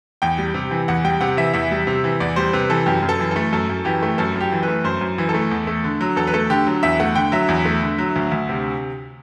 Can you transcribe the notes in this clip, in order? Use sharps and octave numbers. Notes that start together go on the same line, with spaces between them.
E2 G5
G3
C3
E3
E2 F#5
G3 G5
C3 F#5
E3 E5
E2 E5
G3
C3
E3
E2 D5
G3 C5
C3 B4
E3 A4
F#2 G4
F#2
A4
E3
A3 A4
F#2 A4
F#2
E3 G4
A3
F#2 A4
F#2 G4
E3
B4
A3
F#2 C5
F#2
E3
A4
A3
E2
A3
D3
F#3
E2 A4
B4
A3 A4
D3 G4
F#3
E2 E5
A3 F#5
D3 G5
F#3 E5
E2
A3
D3
F#3
D2
D2
C3